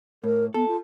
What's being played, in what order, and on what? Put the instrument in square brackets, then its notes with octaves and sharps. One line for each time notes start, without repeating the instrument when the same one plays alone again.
[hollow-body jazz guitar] A2 [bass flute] A#4
[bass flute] B3 [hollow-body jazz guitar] A4
[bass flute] F4